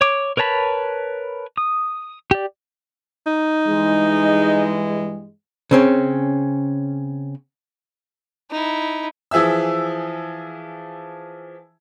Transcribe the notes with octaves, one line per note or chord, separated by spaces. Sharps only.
C#5 D6
A#4 B4 C#5 A5 B5
D#6
G4 D5
D#4
G2 E3 G#3
C#3 C4 C#4
D#4 E4
E3 F3 G#4 E5 E6